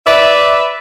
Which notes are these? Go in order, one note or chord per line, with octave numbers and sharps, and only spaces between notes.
B4 D5 E5